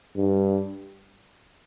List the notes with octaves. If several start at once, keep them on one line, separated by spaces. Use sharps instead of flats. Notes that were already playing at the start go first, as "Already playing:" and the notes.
G2